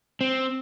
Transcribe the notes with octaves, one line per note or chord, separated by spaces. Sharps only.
C4